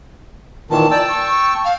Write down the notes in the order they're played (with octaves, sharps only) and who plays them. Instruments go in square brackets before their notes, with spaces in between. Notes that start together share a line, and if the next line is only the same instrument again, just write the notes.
[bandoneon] A#2 D#3 E3 [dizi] A5
[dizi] D5 [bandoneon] G5 A5 E6
[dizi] C#6
F5